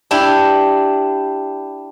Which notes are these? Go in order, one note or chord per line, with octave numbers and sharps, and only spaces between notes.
D4 E4 G4